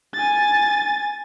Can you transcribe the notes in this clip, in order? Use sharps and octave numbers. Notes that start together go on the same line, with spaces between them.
G#5 A6